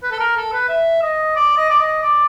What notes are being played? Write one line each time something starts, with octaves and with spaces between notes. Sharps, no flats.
B4
A4
A#4
A4
B4
E5
D#5
D5
D#5
D5
D#5
D5